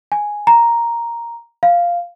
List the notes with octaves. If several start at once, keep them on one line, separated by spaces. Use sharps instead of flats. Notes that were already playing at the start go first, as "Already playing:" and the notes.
G#5
A#5
F5